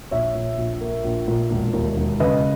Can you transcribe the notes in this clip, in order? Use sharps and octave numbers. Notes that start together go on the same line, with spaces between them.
A#1 C#5 E5
A#2
A#1
A#3
A#1
A#2
E1
D#2
E1
C#3 B4 D#5